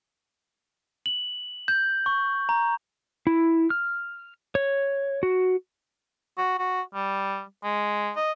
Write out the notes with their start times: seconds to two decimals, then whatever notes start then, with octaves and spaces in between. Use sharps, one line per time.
1.06 F#7
1.68 G6
2.06 C#6
2.49 A#5
3.27 E4
3.70 F6
4.55 C#5
5.23 F#4
6.38 F#4
6.59 F#4
6.95 G3
7.64 G#3
8.16 D#5